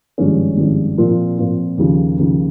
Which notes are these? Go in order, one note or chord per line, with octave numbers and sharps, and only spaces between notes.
G#1 G2 F3 G#3 C#4
G#1 G2 F3 G#3 C#4
A#2 F3 C4 F4
A#2 F3 C4 F4
D#2 C#3 F3
D#2 C#3 F3